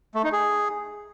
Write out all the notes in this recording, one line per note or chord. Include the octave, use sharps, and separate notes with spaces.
A3
D#4
G#4